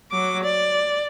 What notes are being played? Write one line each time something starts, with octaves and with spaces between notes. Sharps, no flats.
F#3 D6
D5